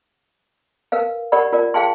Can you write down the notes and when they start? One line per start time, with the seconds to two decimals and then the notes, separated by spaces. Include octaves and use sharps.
0.92 A#4 B4 F5
1.32 G4 A#4 C#5 D5 F#5 B5
1.53 F4 A#4 D5
1.74 G#4 F5 G5 A5 C6